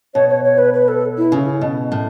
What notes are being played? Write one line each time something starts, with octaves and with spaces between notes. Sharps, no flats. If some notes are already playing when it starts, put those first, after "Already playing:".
B2 C#5
C#5
C#5
B4
B4
A4
E4
C#3
B2
A2